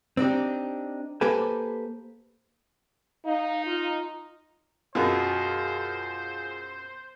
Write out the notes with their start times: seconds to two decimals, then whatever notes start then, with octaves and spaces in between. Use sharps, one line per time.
0.17 C4 D4 D#4 G4
1.21 A#3 G4 A4 B4 C5 G#5
3.26 D#4 F5
3.66 F4
4.95 F#2 B2 F4 G#4 A#4 C5